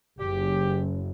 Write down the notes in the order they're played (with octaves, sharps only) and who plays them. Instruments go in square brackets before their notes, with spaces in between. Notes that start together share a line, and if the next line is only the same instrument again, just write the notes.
[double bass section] F#1 [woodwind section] G4